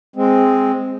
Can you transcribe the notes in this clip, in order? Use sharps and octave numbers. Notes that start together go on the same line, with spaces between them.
G#3 C4